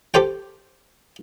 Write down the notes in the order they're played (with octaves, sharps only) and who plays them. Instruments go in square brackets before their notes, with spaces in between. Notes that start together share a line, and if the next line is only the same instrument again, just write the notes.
[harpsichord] G4 A4 C5 G5